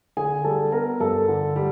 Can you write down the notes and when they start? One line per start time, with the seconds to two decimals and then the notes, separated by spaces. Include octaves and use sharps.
0.17 D3 G#4 G#5
0.44 G3 A4 A5
0.72 B3 A#4 A#5
1.00 G2 A4 A5
1.28 D3
1.56 G3